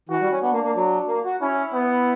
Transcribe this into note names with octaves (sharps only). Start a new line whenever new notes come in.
E3 F#4
G3
C#4
B3 D4
A#3
A#3
F#3
A#3
F#4
C#4 E4
B3